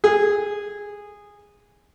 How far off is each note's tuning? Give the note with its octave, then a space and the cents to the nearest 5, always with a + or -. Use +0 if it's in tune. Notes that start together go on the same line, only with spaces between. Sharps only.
G#4 -15